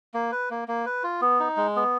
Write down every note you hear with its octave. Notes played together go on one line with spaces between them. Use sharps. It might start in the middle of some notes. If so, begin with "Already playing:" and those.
A#3
B4
A#3
A#3
B4
F4
B3
D#4
G#3
B3